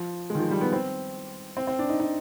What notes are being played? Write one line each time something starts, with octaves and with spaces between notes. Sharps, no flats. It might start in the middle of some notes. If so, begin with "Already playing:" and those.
Already playing: F3
G#3
D#3
F3
G3
B3
C4
C4
C4
D4
D#4
D#4